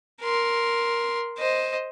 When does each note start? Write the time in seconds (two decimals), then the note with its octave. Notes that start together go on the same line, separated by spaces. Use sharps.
0.22 A#4 C6
1.38 C5 D#5